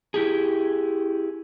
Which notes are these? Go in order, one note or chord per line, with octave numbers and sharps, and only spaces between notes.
E4 G4 G#4